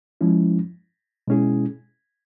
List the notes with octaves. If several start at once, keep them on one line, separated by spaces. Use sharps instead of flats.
F3 G#3 C#4 E4
B2 G#3 C#4 E4 G#4